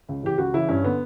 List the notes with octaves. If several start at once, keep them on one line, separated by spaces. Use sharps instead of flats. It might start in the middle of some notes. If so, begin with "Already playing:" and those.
C#2
C#3 E3 G4
C#2 F#4
C#3 E3 E4
G2 C#4
D3 B3